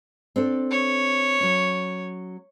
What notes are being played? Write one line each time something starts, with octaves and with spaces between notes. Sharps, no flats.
C4 D4 A4
C#5
F#3 C#4